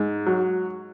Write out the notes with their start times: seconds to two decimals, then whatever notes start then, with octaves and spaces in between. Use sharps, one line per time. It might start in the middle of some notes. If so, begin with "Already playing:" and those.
Already playing: G#2
0.26 F#3